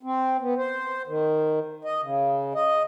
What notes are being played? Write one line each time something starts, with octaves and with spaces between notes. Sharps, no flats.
C4
B3
C5
D#3
D#5
C#3
D#5